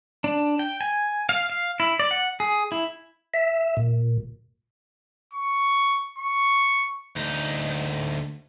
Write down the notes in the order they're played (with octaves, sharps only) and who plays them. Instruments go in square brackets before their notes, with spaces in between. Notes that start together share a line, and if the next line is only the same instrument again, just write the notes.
[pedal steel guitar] D4
G5
G#5
F5
F5
E4
D5
F#5
G#4
E4
[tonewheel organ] E5
A#2
[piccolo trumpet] C#6
C#6
[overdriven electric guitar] D2 D#4